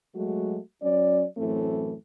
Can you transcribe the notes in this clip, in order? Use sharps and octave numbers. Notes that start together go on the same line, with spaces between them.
F#3 G#3 A3 F#4
F#3 C#4 D5
F#2 A2 E3 A3 C4